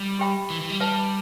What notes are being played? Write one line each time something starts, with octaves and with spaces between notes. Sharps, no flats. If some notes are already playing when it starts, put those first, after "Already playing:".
Already playing: G3
G4 E5 G5 B5
E3
E3
G3
G3 B4 E5 A5